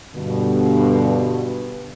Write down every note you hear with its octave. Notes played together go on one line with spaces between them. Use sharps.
G2 B2 D3